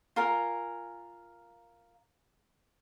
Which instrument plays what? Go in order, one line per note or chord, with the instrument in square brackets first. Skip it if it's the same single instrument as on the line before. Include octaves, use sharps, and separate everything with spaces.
[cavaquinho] F4 A#4 G#5